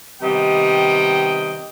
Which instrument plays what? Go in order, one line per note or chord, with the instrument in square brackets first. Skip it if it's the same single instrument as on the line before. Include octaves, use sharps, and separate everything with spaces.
[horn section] C3 D#3 G3 B3 D#5 G5